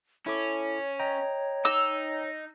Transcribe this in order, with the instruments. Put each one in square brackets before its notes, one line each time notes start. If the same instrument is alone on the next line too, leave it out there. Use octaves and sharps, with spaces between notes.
[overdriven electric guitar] C#4 [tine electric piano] E4 A4 D6 [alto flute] C#5
[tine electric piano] D#5 G5 A#5
[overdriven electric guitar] D#4 [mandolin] E6